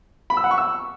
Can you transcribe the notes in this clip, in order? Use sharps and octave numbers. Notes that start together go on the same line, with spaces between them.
B5
E6
F#5
C#6
E6